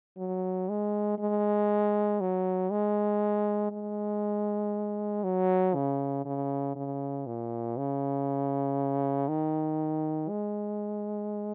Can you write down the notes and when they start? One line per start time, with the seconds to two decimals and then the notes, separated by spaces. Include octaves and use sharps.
0.17 F#3
0.69 G#3
1.19 G#3
2.20 F#3
2.70 G#3
3.71 G#3
5.24 F#3
5.74 C#3
6.25 C#3
6.76 C#3
7.27 A#2
7.77 C#3
9.28 D#3
10.29 G#3